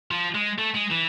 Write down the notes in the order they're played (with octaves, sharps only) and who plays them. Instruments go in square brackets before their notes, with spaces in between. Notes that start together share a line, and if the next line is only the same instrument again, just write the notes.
[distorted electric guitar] F3
G#3
A3
G#3
E3